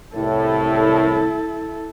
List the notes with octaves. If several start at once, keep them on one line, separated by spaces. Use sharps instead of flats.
C2 A2 E4 A4